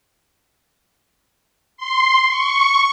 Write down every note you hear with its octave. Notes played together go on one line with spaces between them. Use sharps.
C6
C#6